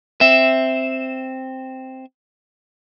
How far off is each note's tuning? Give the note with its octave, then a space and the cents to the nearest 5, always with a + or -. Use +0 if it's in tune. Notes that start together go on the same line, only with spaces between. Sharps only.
C4 +0 E5 +0